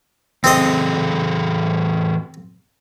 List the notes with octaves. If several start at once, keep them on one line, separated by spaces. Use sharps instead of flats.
E3 C4 G#4 A4 D#5